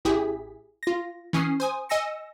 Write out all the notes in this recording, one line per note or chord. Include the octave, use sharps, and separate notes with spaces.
A1 E4 G4 G#4 B6
F4 A#6
E3 C#4 D#6 C7
C5 G#5 D#6
D#5 G#5 E6 A#6 C#7